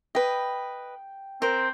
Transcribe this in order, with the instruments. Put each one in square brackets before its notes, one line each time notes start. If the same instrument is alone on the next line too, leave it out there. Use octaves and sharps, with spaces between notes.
[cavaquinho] B4 D#5 [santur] G5
[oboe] C4 [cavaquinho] A#4 C5 [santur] D6